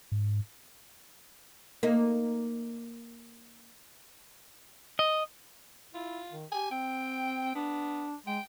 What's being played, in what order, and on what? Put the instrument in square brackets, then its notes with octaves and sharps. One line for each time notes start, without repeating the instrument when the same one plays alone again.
[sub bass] G#2
[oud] A#3 D#4
[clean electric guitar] D#5
[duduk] E4 [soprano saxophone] F4
[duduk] D#3
[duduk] G4 [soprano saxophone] G#5
[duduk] C4 [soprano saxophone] G5
[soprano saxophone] B3 [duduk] D4
[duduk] G#3 [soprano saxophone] G5